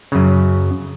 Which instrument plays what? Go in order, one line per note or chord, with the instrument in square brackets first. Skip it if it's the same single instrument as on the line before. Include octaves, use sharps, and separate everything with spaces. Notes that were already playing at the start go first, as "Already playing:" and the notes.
[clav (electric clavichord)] F#2 C#3